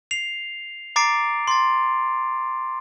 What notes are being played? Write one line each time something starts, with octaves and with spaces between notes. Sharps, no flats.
C7 F7
A#5 D6 A6 C7 D7
C6 A6